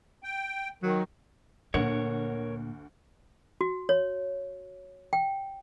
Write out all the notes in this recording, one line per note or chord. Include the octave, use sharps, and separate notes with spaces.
G5
D#3 F#3
D2 A#2 A#4 C#5 F#5 C#7
F#4
C#5
G5